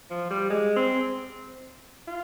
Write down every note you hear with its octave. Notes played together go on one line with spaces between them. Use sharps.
F3
G3
G#3
C4
F4